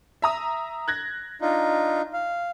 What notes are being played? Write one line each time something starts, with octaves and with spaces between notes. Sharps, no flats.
E5 A#5 D#6
F#6 G#6 A#6
D4 D#4 F4
F5